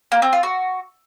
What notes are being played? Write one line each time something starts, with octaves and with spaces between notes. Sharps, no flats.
A#3
C4
F4
F#4